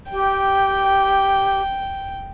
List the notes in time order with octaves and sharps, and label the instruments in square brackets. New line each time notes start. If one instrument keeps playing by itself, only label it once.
[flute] G4 [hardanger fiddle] G5